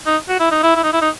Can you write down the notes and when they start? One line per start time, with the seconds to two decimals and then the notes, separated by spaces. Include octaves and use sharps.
0.06 D#4
0.29 F#4
0.40 E4
0.51 D#4
0.63 E4
0.76 E4
0.83 D#4
0.93 E4
1.02 D#4